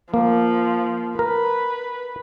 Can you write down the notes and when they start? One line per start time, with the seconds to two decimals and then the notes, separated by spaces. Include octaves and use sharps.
0.14 F3 A#3
1.19 A#4 B4